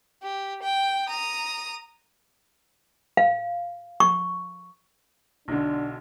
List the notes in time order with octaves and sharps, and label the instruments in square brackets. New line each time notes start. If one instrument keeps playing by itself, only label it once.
[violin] G4
G5
A#5 D#6
[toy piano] F5
C#6
[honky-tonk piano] B1 D3 [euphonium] D4